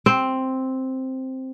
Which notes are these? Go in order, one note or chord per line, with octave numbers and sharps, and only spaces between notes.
C4